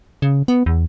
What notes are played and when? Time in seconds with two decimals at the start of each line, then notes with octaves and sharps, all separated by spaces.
0.22 C#3
0.48 B3
0.66 E2